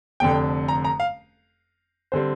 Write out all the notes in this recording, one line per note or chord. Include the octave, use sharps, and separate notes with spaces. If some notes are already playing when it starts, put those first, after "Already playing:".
F1 F2 D3 G5
A#5
A#5
F5
D3 G3 C4 C5